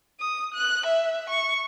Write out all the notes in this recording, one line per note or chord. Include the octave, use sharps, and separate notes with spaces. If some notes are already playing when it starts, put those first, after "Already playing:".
D#6
F#6
E5
C#6